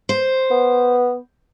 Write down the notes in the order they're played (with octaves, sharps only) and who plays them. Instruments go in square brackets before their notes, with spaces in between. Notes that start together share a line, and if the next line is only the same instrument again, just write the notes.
[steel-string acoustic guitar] C5
[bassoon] B3